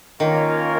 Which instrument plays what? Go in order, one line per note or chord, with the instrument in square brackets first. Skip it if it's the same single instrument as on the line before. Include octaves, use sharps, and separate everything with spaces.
[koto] D#3 [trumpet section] A#3 C#4 F4 A#4 C#5